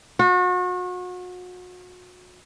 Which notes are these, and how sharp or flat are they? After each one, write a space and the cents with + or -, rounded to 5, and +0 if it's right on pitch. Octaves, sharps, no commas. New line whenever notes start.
F#4 -35